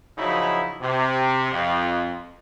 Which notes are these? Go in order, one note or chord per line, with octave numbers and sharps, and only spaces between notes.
C#3 F3 F#3 D#4 E4
C3
F2